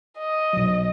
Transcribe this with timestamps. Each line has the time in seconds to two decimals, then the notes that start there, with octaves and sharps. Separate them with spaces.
0.18 D#5
0.53 B1 F#3